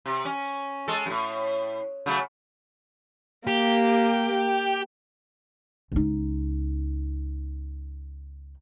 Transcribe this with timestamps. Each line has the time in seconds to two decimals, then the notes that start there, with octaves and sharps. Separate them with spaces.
0.06 C3
0.25 C#4
0.88 G#3 A4
1.06 F#2 A2
2.06 C#3 F#3 A3
3.47 A#3 G4
5.92 C#2 D#4